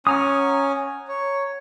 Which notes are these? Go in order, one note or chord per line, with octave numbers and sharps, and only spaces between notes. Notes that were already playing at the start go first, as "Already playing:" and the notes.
C#4 F#5 G#5 A#5 D#6
C#5